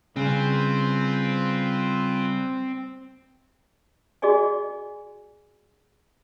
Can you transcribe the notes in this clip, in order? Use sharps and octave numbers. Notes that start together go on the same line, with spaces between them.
C#3 G3 C4 F4 B4 C5
F#4 G#4 D5 D#5 G#5